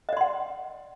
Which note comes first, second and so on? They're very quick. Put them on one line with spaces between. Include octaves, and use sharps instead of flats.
D#5 D5 C6 F#5